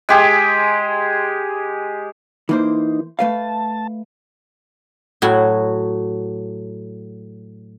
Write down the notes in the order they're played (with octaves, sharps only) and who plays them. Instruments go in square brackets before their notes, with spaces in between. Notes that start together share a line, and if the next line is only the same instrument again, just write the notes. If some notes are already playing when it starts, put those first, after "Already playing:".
[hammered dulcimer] G#3 G4 G#4
[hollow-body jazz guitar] E3 A#3 C5 [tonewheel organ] D#4
[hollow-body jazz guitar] A3 B4 F5 [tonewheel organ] A5
[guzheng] A2 F#3 F#4